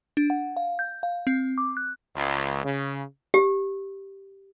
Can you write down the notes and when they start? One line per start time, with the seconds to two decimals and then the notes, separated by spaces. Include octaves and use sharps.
0.17 D4
0.30 F#5
0.57 F5
0.79 G6
1.03 F5
1.27 C4
1.58 D6
1.77 F#6
2.15 C#2
2.63 C#3
3.34 G4